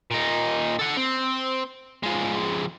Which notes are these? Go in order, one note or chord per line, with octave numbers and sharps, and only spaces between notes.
A#2 D#4
A4 F#5
C4
F3 G#3